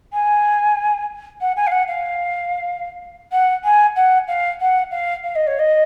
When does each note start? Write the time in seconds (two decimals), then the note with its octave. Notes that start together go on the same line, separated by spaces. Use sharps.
0.12 G#5
1.41 F#5
1.56 G#5
1.67 F5
1.71 F#5
1.88 F5
3.32 F#5
3.64 G#5
3.96 F#5
4.28 F5
4.60 F#5
4.91 F5
5.23 F5
5.35 D#5
5.47 C#5
5.59 D#5